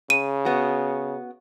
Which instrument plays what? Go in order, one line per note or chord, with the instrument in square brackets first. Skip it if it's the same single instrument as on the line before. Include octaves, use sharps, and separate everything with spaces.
[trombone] C#3 [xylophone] D#7
[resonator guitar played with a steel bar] B3 F#4